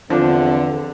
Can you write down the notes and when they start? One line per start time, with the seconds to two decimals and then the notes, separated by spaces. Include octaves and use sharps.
0.10 E2 D3 F3 C4 D4